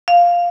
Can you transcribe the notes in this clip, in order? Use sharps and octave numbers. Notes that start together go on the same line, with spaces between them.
F5